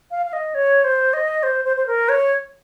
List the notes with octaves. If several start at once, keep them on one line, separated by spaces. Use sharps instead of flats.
F5
F5
D#5
C#5
C5
D#5
C5
C5
C5
A#4
C#5